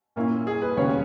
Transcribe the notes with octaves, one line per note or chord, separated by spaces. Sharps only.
A#2 A#3 C#4 E4
G#4
B4
E1 D#2 C#3 G3 C#4 C#5